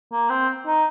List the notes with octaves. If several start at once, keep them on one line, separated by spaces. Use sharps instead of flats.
A#3
C4
D#4